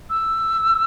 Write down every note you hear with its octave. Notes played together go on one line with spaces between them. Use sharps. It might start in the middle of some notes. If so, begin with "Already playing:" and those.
E6